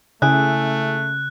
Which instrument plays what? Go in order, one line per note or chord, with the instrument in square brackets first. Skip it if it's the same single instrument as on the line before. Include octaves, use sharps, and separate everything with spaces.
[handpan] C#3 [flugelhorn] A3 [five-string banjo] E4 G#4 [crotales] F#6